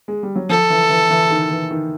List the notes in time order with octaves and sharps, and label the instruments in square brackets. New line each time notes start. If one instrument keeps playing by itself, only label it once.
[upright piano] G#3
G3
F#3
[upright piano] F3 [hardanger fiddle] A4
[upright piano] E3
E3
E3
D#3
E3
D#3